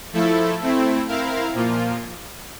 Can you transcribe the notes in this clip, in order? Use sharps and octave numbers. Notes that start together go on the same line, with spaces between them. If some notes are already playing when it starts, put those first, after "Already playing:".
F3 A3 E4 A4
A3 C4 E4
C4 E4 A#4 F5
A#2 F3 A#3 F4